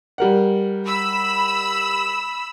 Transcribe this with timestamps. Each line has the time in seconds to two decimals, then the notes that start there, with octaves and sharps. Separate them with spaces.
0.18 G3 A#4 F#5
0.87 B5 E6